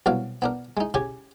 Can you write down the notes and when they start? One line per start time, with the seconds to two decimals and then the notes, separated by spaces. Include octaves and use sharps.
0.06 C2 B2 F#3 F5
0.42 B3 D4 A#4
0.77 G#3 D#4
0.94 C#3 G4 G#5 C#6